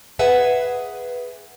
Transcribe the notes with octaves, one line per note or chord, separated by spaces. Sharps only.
G#4 B4 E5 F#5 G#5